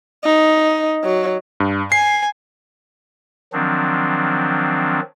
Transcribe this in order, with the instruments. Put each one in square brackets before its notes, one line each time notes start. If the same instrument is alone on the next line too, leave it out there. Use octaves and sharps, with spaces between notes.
[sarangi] D#4
F#3
[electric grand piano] G2
[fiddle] G#5 [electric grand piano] C7
[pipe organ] D#3 F3 F#3 C4 D4